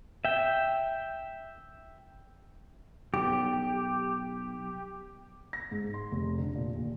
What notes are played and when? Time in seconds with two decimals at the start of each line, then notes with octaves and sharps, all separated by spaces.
0.25 E5 G5
3.14 B1 G4
5.53 A#6
5.71 G#2
5.94 C6
6.12 F1
6.38 D3
6.55 A#2
6.75 D#2